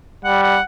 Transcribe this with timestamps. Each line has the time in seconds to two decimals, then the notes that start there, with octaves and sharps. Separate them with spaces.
0.24 G3 F#5
0.43 F#5